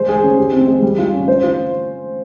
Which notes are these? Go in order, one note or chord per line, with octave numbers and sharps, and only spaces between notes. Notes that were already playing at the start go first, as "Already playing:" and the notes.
Already playing: G#3 C5
G#4
C#4
G4
C4
G#3
G3
F4
C#4
C5
F4